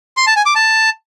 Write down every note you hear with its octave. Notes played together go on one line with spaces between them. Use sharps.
C6
A5
G#5
D6
A5